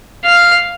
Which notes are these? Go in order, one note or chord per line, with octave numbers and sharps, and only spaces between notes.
F5